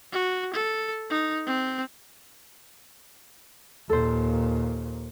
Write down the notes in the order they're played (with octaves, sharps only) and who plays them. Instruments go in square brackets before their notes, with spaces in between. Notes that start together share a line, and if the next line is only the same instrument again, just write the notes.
[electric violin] F#4
A4
D#4
C4
[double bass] D#2 A#2 [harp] A4 C5